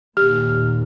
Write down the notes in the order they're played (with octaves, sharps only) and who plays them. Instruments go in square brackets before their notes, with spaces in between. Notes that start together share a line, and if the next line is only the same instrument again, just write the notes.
[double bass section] D#2 A#2 [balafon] G4 [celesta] F6